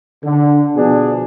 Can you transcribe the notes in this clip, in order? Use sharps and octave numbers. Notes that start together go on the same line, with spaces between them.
D3
B2 F3 B3 D4 G#4